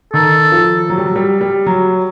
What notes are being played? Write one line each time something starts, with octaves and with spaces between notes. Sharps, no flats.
D#3 A4
F3
F#3
G3
F#3
G3
G3
F#3